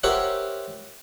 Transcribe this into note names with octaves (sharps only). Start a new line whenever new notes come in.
G4 A#4 C5 C#5 E5 F#5